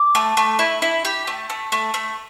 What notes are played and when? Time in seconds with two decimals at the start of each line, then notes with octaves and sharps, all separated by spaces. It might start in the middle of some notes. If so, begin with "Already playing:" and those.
Already playing: D6
0.15 A3
0.37 A3
0.59 E4
0.82 E4
1.05 G4
1.27 A3
1.50 A3
1.72 A3
1.94 A3